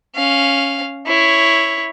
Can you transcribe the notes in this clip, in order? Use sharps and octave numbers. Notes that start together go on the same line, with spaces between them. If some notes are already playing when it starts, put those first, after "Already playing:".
C#4 F5
E4 C#5